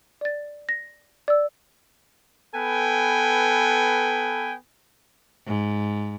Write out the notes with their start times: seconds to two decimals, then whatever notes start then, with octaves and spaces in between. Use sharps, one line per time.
0.21 D5 A6
0.69 A#6
1.28 D5 E6
2.55 B3 A4 B4 G5 G#5
5.46 G#2